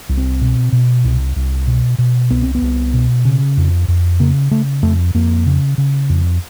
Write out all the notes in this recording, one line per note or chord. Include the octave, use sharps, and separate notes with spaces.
C2
C4
B2
B2
C2
C2
B2
B2
C2 B3
C4
B3
C2
B2
C#3
F2
F2
C#3 A#3
C#3 A3
F2 A3
F2 A#3
C#3
C#3
F2